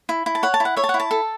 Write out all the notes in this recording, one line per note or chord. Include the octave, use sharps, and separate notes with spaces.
E4
E4
A5
C#5 F#5
A5
E4
F#5
C#5 E5
A5
F#5
E4
A5
A4